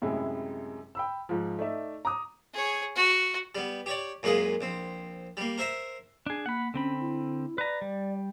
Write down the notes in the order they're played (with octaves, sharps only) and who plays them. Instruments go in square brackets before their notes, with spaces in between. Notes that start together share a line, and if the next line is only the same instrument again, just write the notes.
[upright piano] F#2 A2 C3 G#3 E4
G5 B5 E6
G#2 F3
A3 D#4 D5 E5
A#5 D6 D#6
[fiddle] G#4 C#5
F#4
[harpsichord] G3 B3
G4 C#5 D5
F#2 A#2 G#3 B4 F5 D#6
A#1 C4
G3 A#3
A#4 C5 E5 A#5
[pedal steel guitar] D4 G#4
[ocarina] A#3 [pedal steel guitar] F#5 B5
[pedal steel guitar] D3 C4 B5 [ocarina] C#4
[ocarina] E4
[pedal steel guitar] B4 A#5 [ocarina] D5
[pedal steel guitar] G3